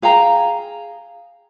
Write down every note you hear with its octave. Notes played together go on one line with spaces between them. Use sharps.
G#4 F5 G5 A#5